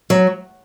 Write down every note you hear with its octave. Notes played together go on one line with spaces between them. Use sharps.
F#3